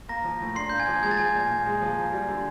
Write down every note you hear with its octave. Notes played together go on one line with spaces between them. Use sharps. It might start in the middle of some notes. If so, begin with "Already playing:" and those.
A#3 A#5 A#6
F3
A2
D4 C6 C7
A#3 G6
G#5 G#6
F3
G#3 G#6
A6
F3 G#5 G#6
A#2
A#2
G#3
F3
A#3
G3
D3